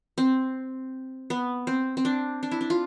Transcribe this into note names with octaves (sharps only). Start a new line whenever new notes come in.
C4
B3
C4
C4
D4
D4
E4
D4
F4